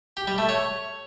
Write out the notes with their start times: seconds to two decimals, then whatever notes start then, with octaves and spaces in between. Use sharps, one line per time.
0.17 G4
0.27 G3
0.38 A3
0.49 C#5